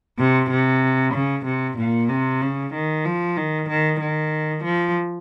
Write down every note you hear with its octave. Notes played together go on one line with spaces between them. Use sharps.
C3
C3
C#3
C3
A#2
C3
C#3
D#3
F3
D#3
D#3
D#3
F3